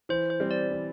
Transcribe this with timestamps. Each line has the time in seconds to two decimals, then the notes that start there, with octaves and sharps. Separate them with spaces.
0.09 E3 C5
0.30 C5
0.40 G3 C4
0.51 D5
0.71 E3